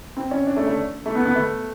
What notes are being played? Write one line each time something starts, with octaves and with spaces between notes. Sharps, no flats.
C4
C#4
D4
A3
A3
A3
B3
B3
A3